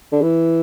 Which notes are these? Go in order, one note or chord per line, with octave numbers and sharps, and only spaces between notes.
D3
E3